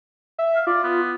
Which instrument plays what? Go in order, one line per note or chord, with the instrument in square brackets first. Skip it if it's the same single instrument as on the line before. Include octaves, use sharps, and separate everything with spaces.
[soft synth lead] E5
[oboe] F5
[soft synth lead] F4 [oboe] D5
[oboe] B3